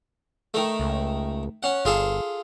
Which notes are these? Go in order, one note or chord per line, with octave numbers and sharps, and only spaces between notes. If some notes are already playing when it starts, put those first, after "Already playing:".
D#3 A3
C#2
C#4 F#5
G1 F4 G#4 A4